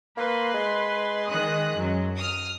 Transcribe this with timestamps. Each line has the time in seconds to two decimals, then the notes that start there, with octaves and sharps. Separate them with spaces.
0.17 A#3 B4 C6
0.54 G#3
1.27 D#3 D#6 F#6
1.77 F#2 F#3
2.17 D#6 F6